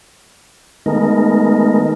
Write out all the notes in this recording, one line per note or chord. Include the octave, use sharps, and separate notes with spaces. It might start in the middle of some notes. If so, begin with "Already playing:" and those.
D#3 G#3 A3 B3 D#4 A#4